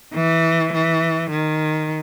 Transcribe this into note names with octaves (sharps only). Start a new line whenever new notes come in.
E3
E3
D#3